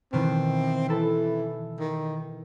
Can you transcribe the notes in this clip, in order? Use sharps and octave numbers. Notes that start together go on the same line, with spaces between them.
B2 D#3 E3 C4
E3 E4 A4 A5
D#3